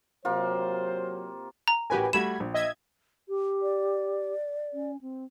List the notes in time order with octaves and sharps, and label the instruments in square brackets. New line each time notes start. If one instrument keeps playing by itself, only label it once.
[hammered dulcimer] C3 A#3 F4 [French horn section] F#3 C5
[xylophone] A#5
[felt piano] A1 F#4 A#4 [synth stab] G4 B4 G#5
[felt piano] G3 A3 F#4 [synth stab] B5 G#6 [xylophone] E7
[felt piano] A#1
[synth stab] D#5 E5 G#6
[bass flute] G4
[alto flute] D5
[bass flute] C#4
C4